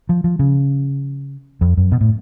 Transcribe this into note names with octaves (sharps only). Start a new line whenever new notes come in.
F3
F3
C#3
F2
F#2
B2
A2